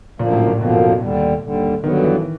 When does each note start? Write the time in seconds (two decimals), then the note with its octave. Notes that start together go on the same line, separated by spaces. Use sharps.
0.19 F#2 A#2 D3 F3 A#3
0.33 A2
0.47 A#2
0.60 F#2 B2 D3 F3 A#3
1.02 D#2 D3 G3
1.42 D#2 D3 G3
1.83 G2 D3 D#3 F#3 B3
2.04 E3